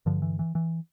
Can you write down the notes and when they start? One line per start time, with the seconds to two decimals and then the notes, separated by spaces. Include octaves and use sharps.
0.06 G2 D3 F3
0.22 E3
0.39 E3
0.55 E3